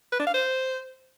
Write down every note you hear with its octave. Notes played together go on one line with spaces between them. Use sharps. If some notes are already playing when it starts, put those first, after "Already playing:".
B4
D4
F5
C5